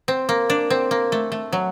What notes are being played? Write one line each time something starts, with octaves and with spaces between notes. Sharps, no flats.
C4
A#3
D4
C4
A#3
A3
A3
F#3